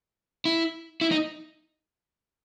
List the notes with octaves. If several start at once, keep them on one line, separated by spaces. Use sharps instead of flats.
E4
E4
D#4